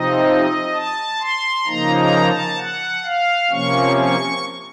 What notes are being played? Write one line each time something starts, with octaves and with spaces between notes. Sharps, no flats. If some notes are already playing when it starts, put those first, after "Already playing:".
Already playing: C3 F3 C4 D#4 D#5
A5
C6
C#3 F3 A#3 D#4 A#5
A#5
A5
F#5
F5
C3 F3 A#3 C#4 C#6
C#6